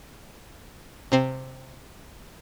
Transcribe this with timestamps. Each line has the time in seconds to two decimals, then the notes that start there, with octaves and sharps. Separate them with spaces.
1.12 C3 C4